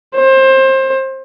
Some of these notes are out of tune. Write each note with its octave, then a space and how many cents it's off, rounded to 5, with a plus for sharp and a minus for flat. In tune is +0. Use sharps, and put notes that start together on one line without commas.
C5 +25